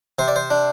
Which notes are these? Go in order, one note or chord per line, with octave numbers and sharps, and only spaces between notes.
C3 C5
D5
C5
D4